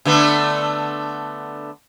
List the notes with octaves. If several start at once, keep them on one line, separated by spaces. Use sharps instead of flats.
D3 A3 B3